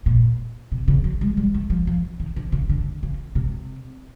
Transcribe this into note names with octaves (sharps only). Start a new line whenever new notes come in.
A#2
C3
C#3
F#3
G#3
G3
A3
F3
F3
D#3
D3
C#3
D3
C#3
C3